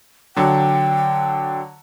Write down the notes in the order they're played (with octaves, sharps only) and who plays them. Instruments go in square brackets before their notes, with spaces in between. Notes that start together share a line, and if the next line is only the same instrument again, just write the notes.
[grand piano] D3 F#3 [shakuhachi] G5